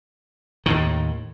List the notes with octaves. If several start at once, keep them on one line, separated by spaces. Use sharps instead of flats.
D#2 A2 D#3